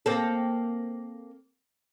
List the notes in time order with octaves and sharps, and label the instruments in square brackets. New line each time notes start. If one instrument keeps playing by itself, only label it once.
[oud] A#3 C4 A4